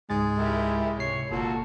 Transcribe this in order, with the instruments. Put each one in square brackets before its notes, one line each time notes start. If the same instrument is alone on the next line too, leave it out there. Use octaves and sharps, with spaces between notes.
[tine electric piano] C#2 G#2 A6 [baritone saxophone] G#3
[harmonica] E4 G4 A#4
[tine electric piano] C3 C7 [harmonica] C#5
[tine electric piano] G1 [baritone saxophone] A#2 [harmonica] F#4 A4